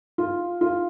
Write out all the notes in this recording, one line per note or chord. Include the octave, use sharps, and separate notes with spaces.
F4
F4